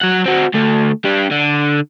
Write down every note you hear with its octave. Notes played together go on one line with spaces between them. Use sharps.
F#3 F#5
C4 F#4
D2 A3
D4 G4
D3